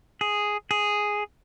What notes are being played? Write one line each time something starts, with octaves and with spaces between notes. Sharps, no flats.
G#4
G#4